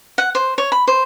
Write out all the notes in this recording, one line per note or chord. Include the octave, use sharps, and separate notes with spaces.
F#5
C5
C#5
B5
C5